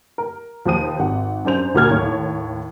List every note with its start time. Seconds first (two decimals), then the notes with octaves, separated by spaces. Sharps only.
0.18 A#4
0.65 D#2 F3 G4 D#6 D#7
0.99 G#1 F#5
1.45 F#2 D4 C5 F7
1.75 D2 A#2 F#4 F6 G#6
1.90 D#2 A2 C#5